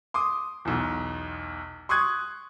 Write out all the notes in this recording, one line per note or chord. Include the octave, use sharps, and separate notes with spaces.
C6 D6 D#6
B1 E2
C6 C#6 D#6 F#6 G#6